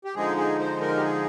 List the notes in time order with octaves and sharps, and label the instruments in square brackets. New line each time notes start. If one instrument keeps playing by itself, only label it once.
[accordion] G4
D3 F3 G#3 D#4 G#4
G#4
C5
A#4
G4
G#4